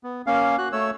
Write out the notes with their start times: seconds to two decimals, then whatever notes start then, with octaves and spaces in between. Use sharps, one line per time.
0.04 B3
0.27 A#3 C#4 F5
0.58 F#4 F#6
0.72 A3 C#5 E6